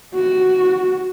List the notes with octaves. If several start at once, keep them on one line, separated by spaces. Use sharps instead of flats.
F#4